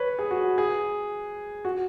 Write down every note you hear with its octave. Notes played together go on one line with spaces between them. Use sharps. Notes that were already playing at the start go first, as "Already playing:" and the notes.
Already playing: B4 C#5
G#4
F#4
G#4
F#4